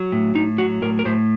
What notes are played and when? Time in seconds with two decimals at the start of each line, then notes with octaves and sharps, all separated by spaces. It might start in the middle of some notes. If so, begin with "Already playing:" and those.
Already playing: F#3
0.12 A2
0.35 A2 D#4
0.58 F#3 F#4
0.82 A2 A#4
0.99 A#4
1.05 A2 C5